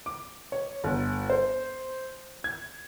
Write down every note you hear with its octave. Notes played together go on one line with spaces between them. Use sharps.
D6
C#5
G1
C5
G#6